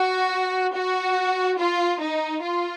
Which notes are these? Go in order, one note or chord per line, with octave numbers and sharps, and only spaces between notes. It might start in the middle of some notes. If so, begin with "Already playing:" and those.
Already playing: F#4
F#4
F4
D#4
F4